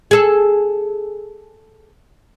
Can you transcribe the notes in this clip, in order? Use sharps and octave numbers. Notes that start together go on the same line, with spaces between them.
G#4 A4